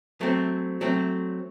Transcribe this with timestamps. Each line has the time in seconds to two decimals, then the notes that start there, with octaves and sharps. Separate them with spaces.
0.21 F#3 A3 C4
0.81 F#3 A3 C4